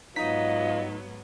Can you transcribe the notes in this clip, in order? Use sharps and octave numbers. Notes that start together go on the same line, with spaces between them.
G#2 F#3 B3 D#4 F4 D#5 B6